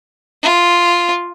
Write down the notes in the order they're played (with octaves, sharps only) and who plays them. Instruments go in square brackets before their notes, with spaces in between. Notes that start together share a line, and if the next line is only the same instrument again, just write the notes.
[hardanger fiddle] F4